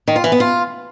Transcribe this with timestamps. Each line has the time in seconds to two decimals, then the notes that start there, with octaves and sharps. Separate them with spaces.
0.08 D#3
0.16 F4
0.24 E3
0.32 B3
0.40 F4